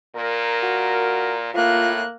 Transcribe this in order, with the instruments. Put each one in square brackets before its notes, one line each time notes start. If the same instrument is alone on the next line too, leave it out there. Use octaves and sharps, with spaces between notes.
[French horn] A#2 [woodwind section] A#4
[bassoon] F#4
[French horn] A2 [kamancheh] A#3 F#6 [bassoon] F4